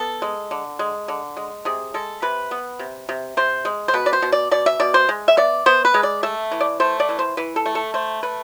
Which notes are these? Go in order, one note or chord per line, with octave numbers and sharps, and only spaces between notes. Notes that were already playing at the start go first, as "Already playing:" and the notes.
Already playing: B3 A4
G#3
D3
G#3
D3
G#3
C3 G#4
G#3 A4
C3 B4
B3
C3
C3
C3 C5
G#3
C5
B2 B4
D5
C5
B2
D5
B2 D5
E5
B2 D5
C5
G#3
E5
B3 D5
B3 C5
B4
G#3
D5
A3 E5
E3
D5
A3 C5
D5
E3
C5
E3 B4
A4
A3
A4
A3 C5
A3 B4